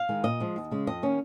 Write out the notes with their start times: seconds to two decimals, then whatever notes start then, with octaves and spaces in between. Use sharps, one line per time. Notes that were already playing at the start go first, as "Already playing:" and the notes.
Already playing: F5
0.09 D#3 G#3
0.24 A#2 D#5
0.40 F3 G#3
0.56 D#2
0.71 C#3 G#3
0.87 F2 D#5
1.03 D#3 A#3 C#4